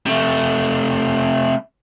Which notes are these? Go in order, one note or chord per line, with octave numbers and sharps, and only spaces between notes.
C3 A3